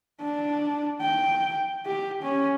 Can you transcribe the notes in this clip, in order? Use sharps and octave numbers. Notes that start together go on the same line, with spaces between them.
D4
G5
G4
C#4